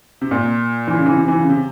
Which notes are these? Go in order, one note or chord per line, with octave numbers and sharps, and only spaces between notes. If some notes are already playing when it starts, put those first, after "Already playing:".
C3
A#2
E3
C#3
E3
C3
E3
C#3
C3